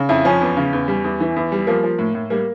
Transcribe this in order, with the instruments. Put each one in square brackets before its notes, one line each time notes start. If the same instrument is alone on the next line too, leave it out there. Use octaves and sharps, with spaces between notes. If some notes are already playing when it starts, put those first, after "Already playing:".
Already playing: [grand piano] C#3
F2 E4
F3 C#4
E2
C#3
E2
G3
E2
E3
E2
G3
F3 A#3
F3
A2
A2
G3 A#3